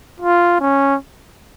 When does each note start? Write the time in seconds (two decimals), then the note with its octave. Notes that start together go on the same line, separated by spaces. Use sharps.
0.20 F4
0.60 C#4